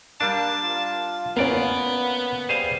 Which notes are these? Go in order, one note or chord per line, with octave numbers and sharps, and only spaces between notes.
G3 A#3 D4 A5
F4
A#3 B3 C#4 D5 F5
G3 G#4 C5 F5